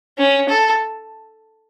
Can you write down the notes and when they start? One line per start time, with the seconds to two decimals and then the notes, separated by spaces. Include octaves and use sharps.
0.18 C#4
0.49 A4